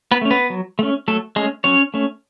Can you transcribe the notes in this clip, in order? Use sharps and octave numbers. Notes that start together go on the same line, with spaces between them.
B3 B4
A3 C#4
B3 B4
F#3
A3 C#4
F#3 A3 A4
G#3 A3 C#4 G#4
F#3 C#4 C#5
A3 C#4